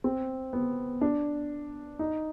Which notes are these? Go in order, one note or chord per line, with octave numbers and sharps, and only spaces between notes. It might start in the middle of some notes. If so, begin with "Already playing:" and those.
C4
B3
D4
D#4